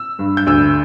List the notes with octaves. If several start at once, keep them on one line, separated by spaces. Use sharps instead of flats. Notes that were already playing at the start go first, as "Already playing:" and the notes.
Already playing: E6
G2
G6
D2 E6